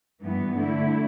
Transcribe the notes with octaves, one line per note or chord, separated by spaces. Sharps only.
G2 E3 B3
D3 A3 E4